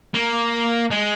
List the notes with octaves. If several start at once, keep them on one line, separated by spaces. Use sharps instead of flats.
A#3
G#3